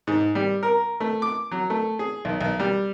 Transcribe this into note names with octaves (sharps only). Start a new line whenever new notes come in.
G#2
G3
A#4
A3
D6
F#3
A3
G#4
B1
B1
G3